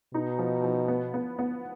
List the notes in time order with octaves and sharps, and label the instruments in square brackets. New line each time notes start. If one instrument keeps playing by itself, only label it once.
[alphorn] B2 [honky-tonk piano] D#4
[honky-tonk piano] F3
F3
B3
B3
B3